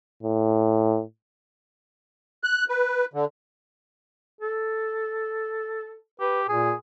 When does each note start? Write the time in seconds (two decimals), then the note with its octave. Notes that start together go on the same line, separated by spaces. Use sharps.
0.23 A2
2.44 F#6
2.69 B4
3.14 D3
4.41 A4
6.20 G4 B4
6.49 A#2 G#4